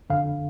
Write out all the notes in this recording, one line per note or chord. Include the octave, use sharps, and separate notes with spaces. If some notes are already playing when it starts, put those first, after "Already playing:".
G1 F2 D3 F5